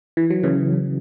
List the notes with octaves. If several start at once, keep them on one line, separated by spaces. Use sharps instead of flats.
E3
F#3
C#3 E3